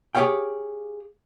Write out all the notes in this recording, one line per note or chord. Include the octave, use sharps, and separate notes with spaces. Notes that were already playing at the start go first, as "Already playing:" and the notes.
G4 G#4 C#5 F5 G5